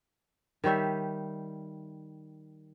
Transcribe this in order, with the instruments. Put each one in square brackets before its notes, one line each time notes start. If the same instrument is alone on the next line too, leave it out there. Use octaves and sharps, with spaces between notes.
[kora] D#3 G3 C#5 E5